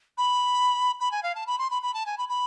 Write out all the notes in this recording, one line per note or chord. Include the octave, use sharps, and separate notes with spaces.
B5
B5
G#5
F5
A5
B5
C6
B5
B5
A5
G#5
B5
B5